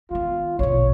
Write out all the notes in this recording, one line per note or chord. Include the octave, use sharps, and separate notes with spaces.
D#3 B3 F4
A#1 B2 C#5